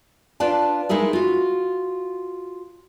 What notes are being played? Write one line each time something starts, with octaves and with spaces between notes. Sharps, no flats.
D4 F4 B4 D5 F5 A5
G#3 D#4 E4 G#4 A#4
F4 F#4